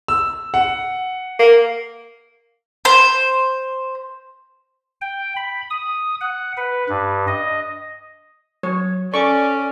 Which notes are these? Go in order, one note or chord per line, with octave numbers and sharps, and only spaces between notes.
E6
F#5
A#3
C5
G5
B5
D#6
F#5
B4
G2
D#5
F#3 C#5
C#4 A4 D5 C#6 D6